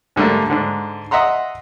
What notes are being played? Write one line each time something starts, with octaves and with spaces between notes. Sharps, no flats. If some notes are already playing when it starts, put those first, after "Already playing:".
G#2 D3 G3 A3 A#3
G#2 D3
D#5 E5 F#5 A#5 C6